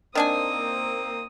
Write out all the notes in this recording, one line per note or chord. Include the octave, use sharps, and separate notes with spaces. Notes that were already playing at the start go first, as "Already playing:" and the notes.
D#3 A#3 C4 D4 G#5 D#6